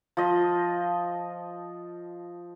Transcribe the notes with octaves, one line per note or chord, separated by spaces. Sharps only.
F3 D#5